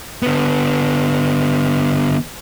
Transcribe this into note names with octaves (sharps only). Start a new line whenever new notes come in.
D3 B3